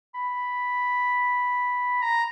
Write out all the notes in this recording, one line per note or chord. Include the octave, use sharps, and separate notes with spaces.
B5
A#5